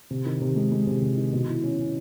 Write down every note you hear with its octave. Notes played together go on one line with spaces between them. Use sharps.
C3
D#3
C3
G#3
G#3
C3
C3
D#3
B2
E4
C#4
C#4